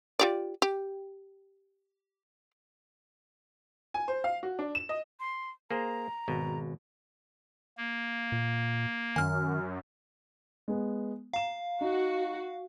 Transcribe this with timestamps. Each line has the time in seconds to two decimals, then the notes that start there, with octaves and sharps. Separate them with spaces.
0.19 F4 G4 D5
0.62 G4
3.94 G#5
4.08 C5
4.24 F5
4.43 F#4
4.59 D4
4.75 E7
4.89 D#5
5.20 C6
5.71 A#3 G#4 C5 A#5
6.28 G#1 B2
7.77 A#3
8.32 A#2
9.16 F#2 D#3 G#5 F6
10.68 G#3 B3
11.33 F5 A#5 E7
11.81 D#4 F#4